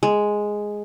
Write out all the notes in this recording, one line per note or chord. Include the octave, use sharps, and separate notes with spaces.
G#3